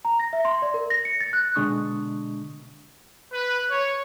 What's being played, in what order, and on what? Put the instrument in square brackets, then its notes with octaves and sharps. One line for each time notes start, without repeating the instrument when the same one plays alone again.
[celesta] A#5
A#6
E5
C6
D5
A#4
A#6
C#7
A6
F#6
[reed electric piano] B2 D3 G#3 D4 C#6 D#6
[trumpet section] B4
C#5